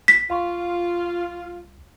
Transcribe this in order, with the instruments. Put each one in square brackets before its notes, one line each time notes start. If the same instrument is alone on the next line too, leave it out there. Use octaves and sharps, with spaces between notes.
[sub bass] A1 [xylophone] B6
[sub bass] C2 [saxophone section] F4 [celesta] F5 C6 C#6